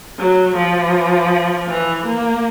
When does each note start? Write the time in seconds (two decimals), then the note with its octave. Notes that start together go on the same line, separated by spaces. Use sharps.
0.19 F#3
0.56 F3
1.69 E3
2.06 A#3